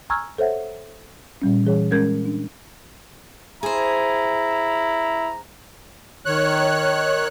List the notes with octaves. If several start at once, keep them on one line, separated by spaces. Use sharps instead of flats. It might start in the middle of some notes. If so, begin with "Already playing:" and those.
G#5 A#5 C#6 E6 F6 G#6
A4 C5 C#5 E5 F#5
A#2 G3 C#4
E3 G3 G#4 C#5
G#3 C#4 A#4 G6 G#6
D4
E4 G#4 C5 A#5
D#3 C#5 F#6